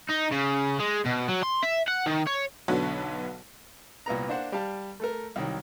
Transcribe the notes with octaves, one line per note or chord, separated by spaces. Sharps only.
D#4
C#3
G#3
B2
F#3
C6
E5
F#5
D#3
C#5
B1 D3 B3 F#4 C#5
C2 A#2 B3 A#5
A#3 D4 C5 F#5
G3 G4 F5 A5
A3 A4 A#4
C2 D#3 F#3